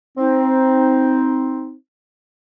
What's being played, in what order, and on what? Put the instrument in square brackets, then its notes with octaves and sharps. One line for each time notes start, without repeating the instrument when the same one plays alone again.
[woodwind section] C4 D#4